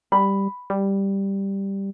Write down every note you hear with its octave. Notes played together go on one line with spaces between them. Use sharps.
G3 B5
G3